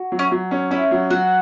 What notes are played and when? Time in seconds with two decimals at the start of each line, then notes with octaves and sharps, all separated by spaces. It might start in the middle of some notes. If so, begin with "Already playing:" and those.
Already playing: F#4
0.12 F#3
0.19 C#4
0.31 F#3
0.51 C#4
0.71 C#4 E4
0.91 F#3
1.10 F#3 F#4